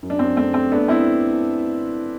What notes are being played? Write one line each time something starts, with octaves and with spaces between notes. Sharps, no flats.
F#2
D4
F#2 C4
A3 C4
A3 C4
A3 B3 D4
C4 E4